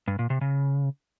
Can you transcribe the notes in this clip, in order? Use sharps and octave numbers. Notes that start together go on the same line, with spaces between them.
G2
A#2
C3
C#3